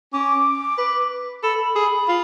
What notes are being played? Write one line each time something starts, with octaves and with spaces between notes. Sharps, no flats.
C#4 D6
B4
A4 B5
G#4
F4